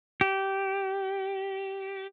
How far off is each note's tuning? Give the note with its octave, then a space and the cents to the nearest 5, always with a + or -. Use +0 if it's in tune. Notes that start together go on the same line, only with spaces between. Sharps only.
G4 -15